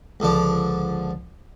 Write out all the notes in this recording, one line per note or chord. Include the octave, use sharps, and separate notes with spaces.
C#2 D3 F3 D5